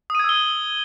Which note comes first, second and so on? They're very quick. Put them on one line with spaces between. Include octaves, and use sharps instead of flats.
D#6 D#7 G#6 E6 G7